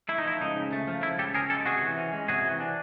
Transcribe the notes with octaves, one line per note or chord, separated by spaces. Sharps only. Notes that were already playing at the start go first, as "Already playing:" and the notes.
A3 E4
D#4
F3 E4
C#2 D#4
C#3
A3
F3
C#2 E4
C#3 G4 A4
C#4 G#4 A#4
G#3 G4 A4
C3 F#4 G#4
E3
C#4
G#3
C3 F#4 G#4
E3
D4